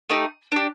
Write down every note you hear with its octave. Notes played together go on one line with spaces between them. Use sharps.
A3 D#4 G4
D4 G4